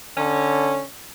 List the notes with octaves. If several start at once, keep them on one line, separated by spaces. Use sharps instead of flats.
D3 C#4